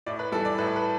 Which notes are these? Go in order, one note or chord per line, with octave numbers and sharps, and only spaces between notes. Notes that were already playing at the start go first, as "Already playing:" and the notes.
A2 D5
B4
E3 G3 A4
D5
A2 B4
B4